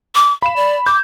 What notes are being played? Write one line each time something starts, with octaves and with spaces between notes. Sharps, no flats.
D6
F5 B5 E7
D5
D6 G6